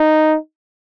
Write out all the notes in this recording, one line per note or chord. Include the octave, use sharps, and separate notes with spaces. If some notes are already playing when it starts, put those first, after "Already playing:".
Already playing: D#4